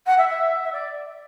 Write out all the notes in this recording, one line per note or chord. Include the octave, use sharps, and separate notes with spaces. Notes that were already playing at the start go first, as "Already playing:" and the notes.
F#5
E5
E5
E5
D5